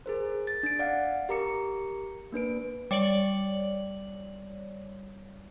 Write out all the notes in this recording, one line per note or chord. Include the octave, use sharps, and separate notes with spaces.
G#4 A#4 C5
A6
D4 D7
D5 F5 F#5
G4 A#4 A#5 D6 C#7
A#3 D4 B4 D7
G3 C#5 D5 F#7